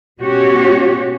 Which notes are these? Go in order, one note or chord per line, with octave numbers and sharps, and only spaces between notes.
B2 G#3 C#4 F#4 G4 C#5